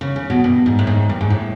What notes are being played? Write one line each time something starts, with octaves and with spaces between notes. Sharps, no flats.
C#3
C#3
B2
G2
G#2
A2
G#2
G2
G#2
A2